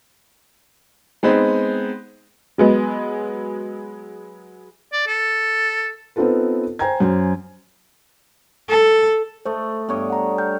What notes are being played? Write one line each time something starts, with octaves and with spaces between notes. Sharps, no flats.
G#3 B3 C4 D#4
F#3 G#3 B3
D5
A4
B3 C4 D#4 F4 A4 B4
C5 G5 G#5 A#5 G#6
F#2 C#4 C5
A4
A3 C5 D#5
G2 B3 C#5 D#5
F#5 A#5
G5 F6 G6